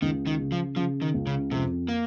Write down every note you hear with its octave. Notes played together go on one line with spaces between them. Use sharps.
C#2 D#3
D#3
C#3
F3
C#3 F3
D#3
C#2
C#3
F2 C3
A#3